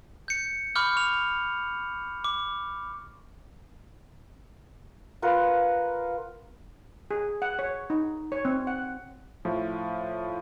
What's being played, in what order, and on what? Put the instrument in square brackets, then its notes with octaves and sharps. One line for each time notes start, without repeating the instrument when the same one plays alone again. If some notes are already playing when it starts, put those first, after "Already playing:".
[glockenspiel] G6 C#7
B5 C#6 D6 F6 G6
C#6 F7
D6
[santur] F4 A#4 B4 F#5
[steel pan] G#4
F#5
C#5
D#4
C#5
C4
F#5
[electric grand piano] A2 F3